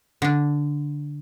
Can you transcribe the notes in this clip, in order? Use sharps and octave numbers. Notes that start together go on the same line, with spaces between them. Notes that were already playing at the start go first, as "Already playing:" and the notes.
D3 D4